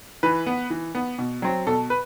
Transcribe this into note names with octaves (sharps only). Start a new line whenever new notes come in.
E3 B4
B3
E3
B3
B2
F#3 C4
B2 A4
B4